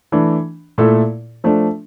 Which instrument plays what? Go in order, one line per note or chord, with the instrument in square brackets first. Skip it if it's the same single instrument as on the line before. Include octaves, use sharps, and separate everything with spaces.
[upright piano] E3 A3 D4
A#2 A3 E4 A4
F3 A3 D4